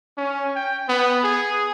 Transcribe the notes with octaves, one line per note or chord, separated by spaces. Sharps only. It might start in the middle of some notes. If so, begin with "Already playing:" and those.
C#4
G5
B3
G#4